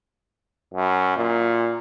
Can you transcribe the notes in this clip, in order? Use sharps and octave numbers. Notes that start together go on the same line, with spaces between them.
F#2
A#2